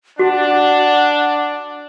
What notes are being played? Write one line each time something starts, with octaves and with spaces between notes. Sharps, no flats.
D4 F#4 F#5